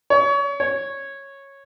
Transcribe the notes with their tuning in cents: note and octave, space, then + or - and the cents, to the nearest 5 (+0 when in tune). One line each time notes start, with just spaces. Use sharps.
C#5 +30
C#5 -10